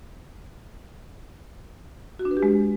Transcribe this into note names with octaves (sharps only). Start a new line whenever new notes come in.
F#4
D4
B4
G4
G#3